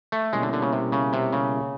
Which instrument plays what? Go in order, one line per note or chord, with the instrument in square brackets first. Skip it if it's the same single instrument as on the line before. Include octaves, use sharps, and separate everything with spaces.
[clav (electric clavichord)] A3
[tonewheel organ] B2 G3 A#3 C#4 E4 [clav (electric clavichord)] G#3
[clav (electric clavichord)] D3
D3
C#3
C3
C#3
C3
C#3